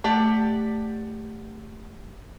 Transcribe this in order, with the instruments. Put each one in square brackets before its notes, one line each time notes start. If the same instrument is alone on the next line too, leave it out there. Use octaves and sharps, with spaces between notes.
[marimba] A3 [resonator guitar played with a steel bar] G4 D5 F#5